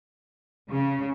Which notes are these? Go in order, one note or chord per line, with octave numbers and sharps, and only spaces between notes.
C#3